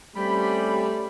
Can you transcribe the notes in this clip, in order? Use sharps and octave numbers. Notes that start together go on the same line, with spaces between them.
G3 A3 C4 C#4 G4 B5